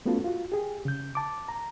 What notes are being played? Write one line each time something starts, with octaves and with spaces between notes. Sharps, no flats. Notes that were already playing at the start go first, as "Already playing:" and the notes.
A3 B3 C#4 F4 F#4 A4
F4 F#4
G4 G#4
C#3 G6
A5 D6
A#5